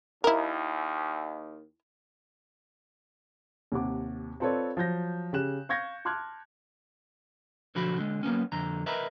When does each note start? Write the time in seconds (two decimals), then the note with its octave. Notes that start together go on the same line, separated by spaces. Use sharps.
0.24 D#2 E4 A#4
3.72 D#2 C3 F#5 D6
4.40 C4 F4 A4 B4 C#5 D5
4.77 F3 F#3 G6 A#6
5.33 C#3 G4 F#6 E7
5.69 F5 C#6 G6 G#6 A#6 C#7
6.05 A5 C6 D6 F6 F#6 G#6
7.75 B1 D3 F3 F#4 B5
7.97 D3 G#3
8.23 F#3 A#3 B3 C#4
8.52 F2 D3 A#5
8.86 A#4 B4 D#5 E5 A#5 B5